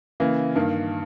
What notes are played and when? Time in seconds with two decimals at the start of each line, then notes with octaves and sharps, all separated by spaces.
0.20 C#3 E3 A#3
0.56 G2 D#3 A#3